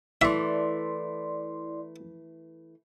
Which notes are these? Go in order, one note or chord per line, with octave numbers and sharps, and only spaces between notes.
E3 A3 E4 D5 E5 C6